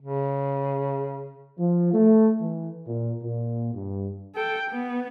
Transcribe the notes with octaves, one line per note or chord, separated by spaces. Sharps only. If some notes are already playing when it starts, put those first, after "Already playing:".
C#3
F3
A3
E3
A#2
A#2
G2
A4 G5
B3